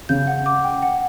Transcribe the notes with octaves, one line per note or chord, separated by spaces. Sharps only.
C#3 G6
F#5
D6
G5
F#5